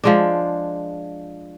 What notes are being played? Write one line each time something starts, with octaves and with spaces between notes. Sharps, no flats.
F3 G#3 D4